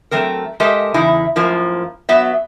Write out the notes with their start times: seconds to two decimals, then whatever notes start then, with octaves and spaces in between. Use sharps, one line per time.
0.11 F#3 A3 C4 A#4
0.60 G#3 G4 A4 A#4 D#5 E5
0.94 E2 C#3 D#4 E4
1.36 F#2 A2 F3 A#3
2.09 F#3 B3 E5